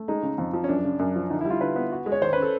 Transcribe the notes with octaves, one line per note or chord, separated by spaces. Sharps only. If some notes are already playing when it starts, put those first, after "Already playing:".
Already playing: A3
G#3 D#4
C#3
F2
F3
C#4
F#2 D4
C#3
F#2
F3
D3 D#4
E4
G3
F4
D3 B4
B3
F#4
G#3
C#5
D#3 C5
B4
C#4
A4